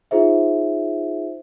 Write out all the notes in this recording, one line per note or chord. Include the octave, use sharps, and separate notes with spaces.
D#4 F4 G#4 C5 E5